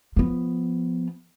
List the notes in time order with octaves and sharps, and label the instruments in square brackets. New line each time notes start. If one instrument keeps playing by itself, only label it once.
[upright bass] F3 B3